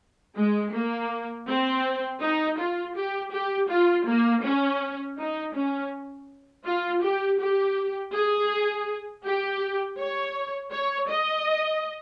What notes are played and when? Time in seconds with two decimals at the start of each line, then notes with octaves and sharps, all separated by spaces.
0.36 G#3
0.73 A#3
1.47 C4
2.21 D#4
2.58 F4
2.96 G4
3.32 G4
3.69 F4
4.06 A#3
4.43 C#4
5.17 D#4
5.55 C#4
6.65 F4
7.02 G4
7.39 G4
8.13 G#4
9.25 G4
9.98 C#5
10.72 C#5
11.09 D#5